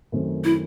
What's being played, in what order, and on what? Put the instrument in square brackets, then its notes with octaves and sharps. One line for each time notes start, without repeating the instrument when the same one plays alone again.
[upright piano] F#2 D#3 A3 C4
[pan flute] E4